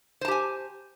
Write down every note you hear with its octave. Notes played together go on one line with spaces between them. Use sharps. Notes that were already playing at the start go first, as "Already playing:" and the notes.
G4 C5 G#5 A5